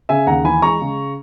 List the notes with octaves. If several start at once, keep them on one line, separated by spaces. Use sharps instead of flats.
C#3 E5 G#5
D#2 F#5 A#5
E3 G#5 B5
G#3 A#5 C#6
C#3